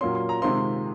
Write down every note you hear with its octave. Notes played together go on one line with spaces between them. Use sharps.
A#2 F#3 A#3 C#4 C6
C6
A#5
C3 D#3 G#3 C4 F4 C6